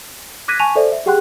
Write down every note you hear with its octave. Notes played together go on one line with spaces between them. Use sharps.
D6 F#6 G#6 A#6 B6 D#7
G#5 A5 C#6 D#7 F7
A4 C5 D5 E5
E5
G4 G#4 F#5 G5 C6 F#6